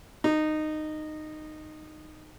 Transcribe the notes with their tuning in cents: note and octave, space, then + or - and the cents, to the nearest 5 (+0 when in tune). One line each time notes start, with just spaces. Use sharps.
D#4 -15